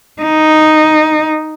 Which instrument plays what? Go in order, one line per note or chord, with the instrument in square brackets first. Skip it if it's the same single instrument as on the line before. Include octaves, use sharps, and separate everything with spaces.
[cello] D#4